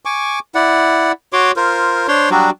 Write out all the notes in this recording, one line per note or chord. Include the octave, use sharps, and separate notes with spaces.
G#5 C#6 D6
E4 D5 F#5
F#4 C#5 C6 D6
F4 A#4 C5
D4 C5 C#5 C6
F#3 G3 D4 F#4